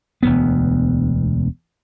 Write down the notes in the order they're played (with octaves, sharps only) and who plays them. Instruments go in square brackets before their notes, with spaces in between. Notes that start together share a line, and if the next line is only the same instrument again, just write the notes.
[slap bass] E1 D2 B3